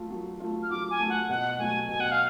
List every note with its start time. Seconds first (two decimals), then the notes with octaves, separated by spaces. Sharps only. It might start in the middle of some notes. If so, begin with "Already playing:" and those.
Already playing: F#3 A3 F4
0.10 F#3
0.40 A3 F4
0.63 F6
0.70 F#3 D6
0.90 G#5
1.00 A3 F4
1.09 F#5
1.29 B2 F#5
1.59 F#3 A3 G#5
1.88 B2 G#5
2.00 F#5
2.11 F5